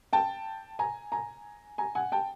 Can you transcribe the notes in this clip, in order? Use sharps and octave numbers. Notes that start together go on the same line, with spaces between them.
G5 A5
G#5 A#5
G#5 A#5
G#5 A#5
F#5 G#5
G5 A5